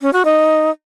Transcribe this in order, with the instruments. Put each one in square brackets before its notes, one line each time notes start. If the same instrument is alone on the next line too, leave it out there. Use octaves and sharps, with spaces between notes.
[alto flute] C#4
F#4
D#4